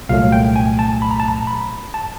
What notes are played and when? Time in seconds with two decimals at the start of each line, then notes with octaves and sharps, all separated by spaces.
0.09 C2 A#2 F#3 A3 F5
0.32 G5
0.56 G#5
0.79 A5
1.02 B5
1.11 A#5
1.20 A5
1.28 A#5
1.47 B5
1.94 A5